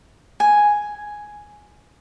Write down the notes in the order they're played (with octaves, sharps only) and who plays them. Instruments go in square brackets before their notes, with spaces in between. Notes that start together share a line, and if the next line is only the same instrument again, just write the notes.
[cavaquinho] G#5